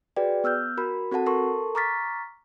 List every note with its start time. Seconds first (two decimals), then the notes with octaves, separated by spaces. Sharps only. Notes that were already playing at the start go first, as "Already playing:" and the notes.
0.16 F#4 G#4 B4 D5 G5
0.44 B3 E6 F6 G6
0.78 F#4 A#4 B5
1.11 C4 F#4 A4 F#5 A5
1.26 A4 A#4 A5 C6 C#6
1.75 A#5 C#6 D6 F6 A6 B6